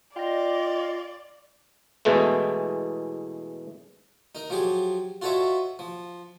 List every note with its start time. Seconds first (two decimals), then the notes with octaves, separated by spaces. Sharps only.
0.16 F4 D5 D#5 G5 A#6
2.05 E2 B2 E3 G#3 A3
4.35 D#4 A#4
4.50 F3 F#3 G4 G#4
5.22 F4 F#4 A4 C#5 D#5 E5
5.79 F3